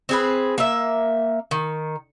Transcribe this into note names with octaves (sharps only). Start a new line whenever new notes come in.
C4 G#4 B4
A#3 E5
D#3